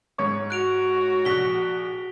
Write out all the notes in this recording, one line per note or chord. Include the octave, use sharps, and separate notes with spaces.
G#2 C#5 C#6
F#4 F#6 D7 F7
A#1 F#6 B6 G7